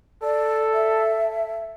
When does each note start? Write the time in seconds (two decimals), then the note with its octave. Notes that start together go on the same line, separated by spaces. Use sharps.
0.23 A4 D5
0.74 E5